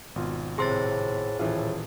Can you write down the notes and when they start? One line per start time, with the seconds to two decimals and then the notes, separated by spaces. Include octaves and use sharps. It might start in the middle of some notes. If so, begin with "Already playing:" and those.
0.16 G#1 B2 F4
0.58 A2 C3 G#4 C5 C6 A6
1.39 D#1 A2 E3 F4 E5